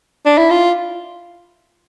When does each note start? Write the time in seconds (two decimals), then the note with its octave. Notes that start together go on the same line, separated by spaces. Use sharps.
0.26 D4
0.38 E4
0.50 F4